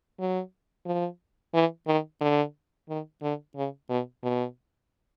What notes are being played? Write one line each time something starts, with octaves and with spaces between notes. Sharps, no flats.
F#3
F3
E3
D#3
D3
D#3
D3
C#3
B2
B2